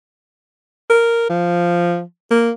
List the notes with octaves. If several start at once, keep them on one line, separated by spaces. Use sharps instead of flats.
A#4
F3
A#3